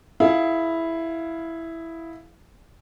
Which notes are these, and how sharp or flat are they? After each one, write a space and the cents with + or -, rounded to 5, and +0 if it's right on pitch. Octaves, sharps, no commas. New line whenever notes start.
E4 +0 G#4 +25 F5 +5